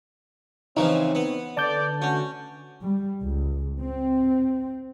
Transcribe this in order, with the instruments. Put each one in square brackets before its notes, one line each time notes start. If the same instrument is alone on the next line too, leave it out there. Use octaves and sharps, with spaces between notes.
[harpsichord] C#3 E3 F3 [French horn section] C4 [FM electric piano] D#4 [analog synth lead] C#5
[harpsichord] B3
[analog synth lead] D3 [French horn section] D5 [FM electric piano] A5 G6
[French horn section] A3 D4 F#4 [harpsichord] C#4
[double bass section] G3
C#2
C4